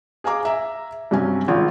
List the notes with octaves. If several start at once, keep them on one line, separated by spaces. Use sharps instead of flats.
G#4 F5 G#5 A#5 D6
E5 A#5
G2 C3 F#3 C#4 G#5
G#1 F4